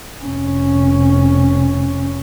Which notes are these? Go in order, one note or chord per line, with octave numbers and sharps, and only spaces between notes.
F1 C#4